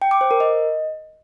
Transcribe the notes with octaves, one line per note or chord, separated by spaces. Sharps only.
G5
D6
C5
A#4
D#5